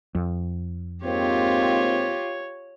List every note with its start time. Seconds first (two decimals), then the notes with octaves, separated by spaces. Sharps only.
0.15 F2
1.04 G#2 A#3 C4 F4 G4 C#5